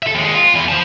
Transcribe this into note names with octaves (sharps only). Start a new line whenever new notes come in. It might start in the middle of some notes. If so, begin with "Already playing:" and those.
A4 E5
D#2 G#3
F4
E2 E3
C5 A5